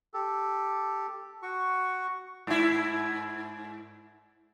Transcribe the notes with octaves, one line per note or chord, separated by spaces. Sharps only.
G4 A4
F#4 C#6
G#2 E4